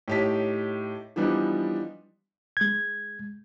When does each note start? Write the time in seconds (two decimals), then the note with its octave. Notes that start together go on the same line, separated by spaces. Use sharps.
0.08 A2 D#4 G4 C#5 A5 B6
1.16 E3 F3 G3 B3 D4 D#4
2.57 G#3 G#6